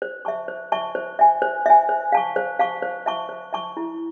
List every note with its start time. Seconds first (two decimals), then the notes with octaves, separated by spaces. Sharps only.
0.02 C5
0.25 E5 A5 C#6
0.48 C5
0.72 E5 A5 C#6
0.95 C5
1.19 E5 G#5
1.42 C5
1.66 E5 G#5
1.89 C5
2.12 F5 A5 C#6
2.36 C5
2.59 F5 A5 C#6
2.82 C5
3.06 E5 A5 C#6
3.29 C5
3.53 E5 A5 C#6
3.77 E4